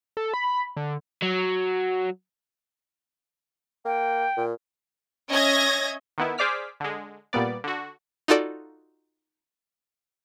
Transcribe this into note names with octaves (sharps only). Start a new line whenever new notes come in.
A4
B5
D3
F#3
A#3 G5
A#2
C#4 D#5 E5 G#6 A#6
D#3 B3 E4
G#4 C5 D5 D6 F6 B6
D3 G#3
A#2 G3 B3 D5
D3 F#4
D#4 F4 F#4 A4 D5